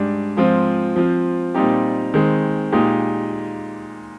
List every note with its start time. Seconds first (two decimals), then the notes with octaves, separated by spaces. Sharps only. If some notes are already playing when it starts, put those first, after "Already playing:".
Already playing: G#2 G3 D4
0.37 G#2 F3 C4 F4
0.96 F3 C4 F4
1.55 A#2 G3 C4 D#4 G4
2.14 D#3 G#3 C4
2.72 A#2 G#3 D#4 G4